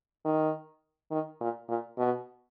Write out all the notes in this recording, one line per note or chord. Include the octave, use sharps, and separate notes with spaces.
D#3
D#3
A#2
A#2
B2